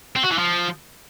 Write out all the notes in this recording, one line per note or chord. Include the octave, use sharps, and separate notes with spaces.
C4
F#4
E3
F3